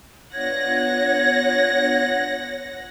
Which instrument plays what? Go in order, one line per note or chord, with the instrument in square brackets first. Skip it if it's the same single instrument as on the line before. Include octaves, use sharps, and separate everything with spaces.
[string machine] B3 D4 F4 [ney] C#5 [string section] F#5 A#6 [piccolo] G#6